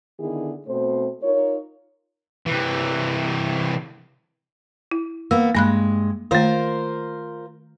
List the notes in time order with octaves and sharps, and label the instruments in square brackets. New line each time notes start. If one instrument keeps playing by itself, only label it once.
[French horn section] D3 D#3 B3 E4 G#4
B2 A3 C4 C5
D#4 F4 A#4 C#5
[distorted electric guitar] C3 E3
[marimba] E4
[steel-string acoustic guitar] A#3 B3 [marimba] E6
[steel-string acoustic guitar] G2 G#3 [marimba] A#3 B5 F#6
[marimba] D#3 A3 [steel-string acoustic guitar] F4 A#4 C5